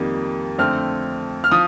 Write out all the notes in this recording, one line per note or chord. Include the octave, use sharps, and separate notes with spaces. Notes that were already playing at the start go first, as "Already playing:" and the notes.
Already playing: F2 D#3 G3 A#3
F2 D3 A3 C4 F6
F6
F3 D#6